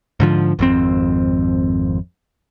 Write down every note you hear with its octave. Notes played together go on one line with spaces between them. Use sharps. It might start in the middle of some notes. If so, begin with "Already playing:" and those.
G#2 D3 F3
G#1 F2 C4